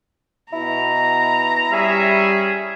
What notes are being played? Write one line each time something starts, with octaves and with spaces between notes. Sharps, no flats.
B2 E4 A#5
G3 C#4 G#4 E5